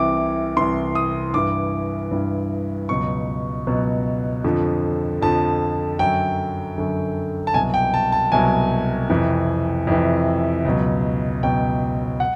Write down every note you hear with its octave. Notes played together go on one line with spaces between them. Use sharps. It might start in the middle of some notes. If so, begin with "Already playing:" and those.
Already playing: C2 C3 E3 D6
C2 C3 E3 C6
D#6
G2 E3 D6
G2 E3
C#2 B2 F#3 C#6
C#2 B2 F#3
F2 D3 F3
F2 D3 F3 A5
F#2 D3 F#3 G5
F#2 D3 F#3
A5
C2 B2 F#3 G#5
G5
A5
A5
C2 B2 F#3 G#5
F2 C3 E3
F2 C3 E3
C#2 B2 F#3
C#2 B2 F#3 G5
F#5